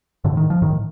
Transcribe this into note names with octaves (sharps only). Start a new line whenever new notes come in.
A2 D3
D#3
F3
A2 D#3